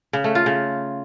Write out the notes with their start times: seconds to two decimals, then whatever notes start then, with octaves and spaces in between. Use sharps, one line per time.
0.13 C#3
0.24 A3
0.35 F4
0.46 C#3